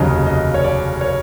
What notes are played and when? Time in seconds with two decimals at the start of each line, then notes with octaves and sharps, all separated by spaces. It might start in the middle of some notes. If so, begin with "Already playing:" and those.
Already playing: F1 D#2 C#3 F#3 D#5
0.26 D#5
0.54 C#5
0.64 D5
1.01 C#5